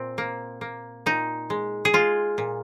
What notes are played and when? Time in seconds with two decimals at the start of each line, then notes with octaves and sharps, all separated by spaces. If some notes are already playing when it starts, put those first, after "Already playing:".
Already playing: A#2 C4
0.18 A#3
0.61 A#3
1.06 A#2 D#4
1.50 G#3
1.85 G#4
1.93 G#3 F4
2.38 A#2